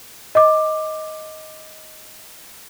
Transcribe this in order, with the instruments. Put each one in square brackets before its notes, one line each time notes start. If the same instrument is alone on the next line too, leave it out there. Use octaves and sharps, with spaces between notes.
[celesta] D#5 D6